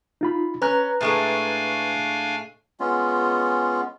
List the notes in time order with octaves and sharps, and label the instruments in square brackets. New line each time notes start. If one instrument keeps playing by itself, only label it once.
[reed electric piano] D#4 F4 B5
[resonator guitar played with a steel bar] C#4 [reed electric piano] B4 A#5 F#6
[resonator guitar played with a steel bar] A2 G#3 A3 [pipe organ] D4 F5 G#5
[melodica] G#3 B3 C#4 F4